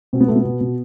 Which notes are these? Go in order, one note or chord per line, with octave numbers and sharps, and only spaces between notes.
B2 C4
B3
B2 A3
B3
B2
B2